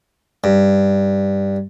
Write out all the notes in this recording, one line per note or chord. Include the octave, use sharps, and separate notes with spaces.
G2